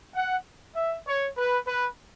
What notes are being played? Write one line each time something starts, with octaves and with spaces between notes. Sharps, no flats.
F#5
E5
C#5
B4
B4